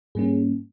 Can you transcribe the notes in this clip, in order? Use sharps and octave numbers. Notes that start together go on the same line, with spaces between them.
G#2 G3 A#3 C#4 G#4